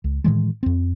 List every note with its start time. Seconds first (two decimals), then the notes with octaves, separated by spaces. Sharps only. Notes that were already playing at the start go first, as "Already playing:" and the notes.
0.04 C#2
0.24 A2 D#3 E3 G#3
0.63 F2 C4